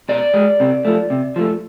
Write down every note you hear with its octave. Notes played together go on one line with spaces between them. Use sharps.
B2 D5
G#3
C3
F3 A3
C3
F3 A3